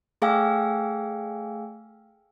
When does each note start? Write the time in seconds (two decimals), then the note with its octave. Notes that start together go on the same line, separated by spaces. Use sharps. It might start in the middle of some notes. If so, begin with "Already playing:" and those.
0.22 A3 G#4 F5 G5 G#5 E6